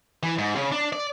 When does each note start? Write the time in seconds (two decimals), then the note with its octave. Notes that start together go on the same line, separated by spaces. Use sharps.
0.23 E3
0.38 G#2
0.56 C#3
0.72 D4
0.93 D5